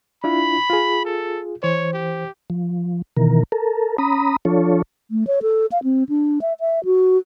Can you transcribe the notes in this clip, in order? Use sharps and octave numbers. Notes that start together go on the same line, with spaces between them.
D4 E4 F4 B5
F4 G#4
A4
E3 C5 C#5
G4
F3
B2 D#3 E3 A#4
A4 A#4
C#4 A#5 B5 D#6
F3 D4 F4 A4 C#5
A3
C#5
A4
F5
C4
D4
E5
E5
F#4